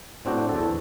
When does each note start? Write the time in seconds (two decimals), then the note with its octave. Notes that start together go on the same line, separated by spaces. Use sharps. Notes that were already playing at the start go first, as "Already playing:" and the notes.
0.25 A2 C4 D4 F#4 G5
0.49 E2 A4